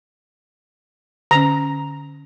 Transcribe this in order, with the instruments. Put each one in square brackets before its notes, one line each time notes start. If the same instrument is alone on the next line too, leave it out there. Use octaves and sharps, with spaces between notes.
[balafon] D3 C#4 [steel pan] A#5